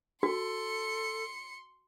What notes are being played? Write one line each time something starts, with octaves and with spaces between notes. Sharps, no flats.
F#4 A4 C6 C#7